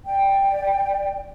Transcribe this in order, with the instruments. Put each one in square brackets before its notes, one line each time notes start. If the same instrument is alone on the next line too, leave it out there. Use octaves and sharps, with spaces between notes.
[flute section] D5 G5